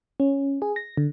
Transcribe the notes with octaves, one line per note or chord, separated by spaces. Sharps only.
C#4
G#4
A#6
D3